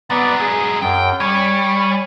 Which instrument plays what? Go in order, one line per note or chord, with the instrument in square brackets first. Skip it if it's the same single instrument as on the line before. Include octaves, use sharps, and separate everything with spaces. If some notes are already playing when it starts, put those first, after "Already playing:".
[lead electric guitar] F#3 G#3 [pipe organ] B3 D5
[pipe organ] G#4
[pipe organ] F#2 [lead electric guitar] G5
[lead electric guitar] G3 [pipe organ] C#5 G#5